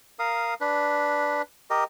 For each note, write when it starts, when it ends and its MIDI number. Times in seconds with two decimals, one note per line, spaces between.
0.19 0.54 70
0.19 0.54 77
0.19 0.54 87
0.61 1.42 62
0.61 1.42 71
1.70 1.84 67
1.70 1.84 70
1.70 1.84 75